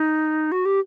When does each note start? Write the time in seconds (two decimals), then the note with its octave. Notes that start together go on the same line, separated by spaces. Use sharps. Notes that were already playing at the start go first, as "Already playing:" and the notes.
Already playing: D#4
0.52 F#4
0.65 G4